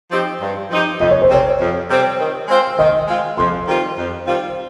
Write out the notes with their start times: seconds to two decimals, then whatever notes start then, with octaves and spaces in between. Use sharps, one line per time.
0.11 F3 C4 D#4 G4
0.41 G2
0.70 F3 C4 D#4 G4
1.00 F2 D#5
1.11 C#5
1.22 C5
1.30 C3 G3 C4 C#5
1.60 F2
1.89 C3 G3 C4
2.19 D#3
2.48 G#3 C4 F4 C5
2.78 D#3 D#5
3.08 G#3 C4 F4 C5
3.37 F2 C6
3.67 D#3 G3 C4 F4
3.98 F2
4.27 D#3 G3 C4 F4